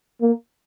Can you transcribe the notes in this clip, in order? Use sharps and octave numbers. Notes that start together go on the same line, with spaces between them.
A#3